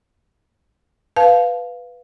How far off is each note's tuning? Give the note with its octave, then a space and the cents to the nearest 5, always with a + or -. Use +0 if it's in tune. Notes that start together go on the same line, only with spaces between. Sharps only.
B4 +5 F5 +0 A5 -25